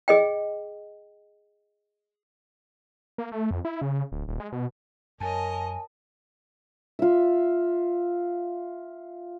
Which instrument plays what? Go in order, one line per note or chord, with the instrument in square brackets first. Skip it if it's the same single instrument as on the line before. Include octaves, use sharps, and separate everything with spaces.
[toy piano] G#4 D#5 G5
[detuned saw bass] A#3
A3
F2
E4
C#3
D1
D#1
G#3
B2
[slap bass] F#2 [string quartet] A#4 C#5 D#5 [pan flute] G#5 [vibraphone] A5
[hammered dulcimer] F4 E5